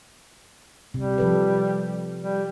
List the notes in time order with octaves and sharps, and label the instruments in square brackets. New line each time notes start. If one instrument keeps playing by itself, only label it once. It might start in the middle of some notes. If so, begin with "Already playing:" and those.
[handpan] C3 [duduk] G3
[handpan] F3 A4 B4
[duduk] G3